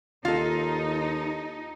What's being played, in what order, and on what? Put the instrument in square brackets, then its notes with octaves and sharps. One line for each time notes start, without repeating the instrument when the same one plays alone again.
[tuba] D#2 [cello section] D#4 [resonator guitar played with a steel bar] F4 A4